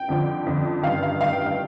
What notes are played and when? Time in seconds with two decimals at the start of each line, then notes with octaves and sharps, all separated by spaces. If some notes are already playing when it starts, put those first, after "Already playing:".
Already playing: G5
0.09 F2 D3 F3
0.46 F2 D3 F3
0.83 G2 D#3 F5
1.03 F5
1.21 G2 D#3 F5
1.33 G5
1.46 F5